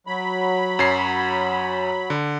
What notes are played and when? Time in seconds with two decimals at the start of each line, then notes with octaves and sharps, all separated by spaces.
0.07 F#3 B5
0.79 F#2 C#5 C7
2.10 D3